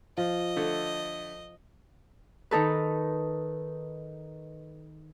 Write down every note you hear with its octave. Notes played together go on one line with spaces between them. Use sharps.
F3 D#5
D3 A3
D#3 D#4 A4 B4